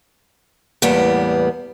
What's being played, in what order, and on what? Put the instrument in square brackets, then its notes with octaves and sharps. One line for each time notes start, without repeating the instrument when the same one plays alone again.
[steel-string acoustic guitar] E2 A2 G3 A#3 B3